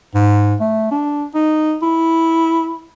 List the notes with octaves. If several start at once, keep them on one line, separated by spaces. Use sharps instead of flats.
G#2
A3
D4
D#4
E4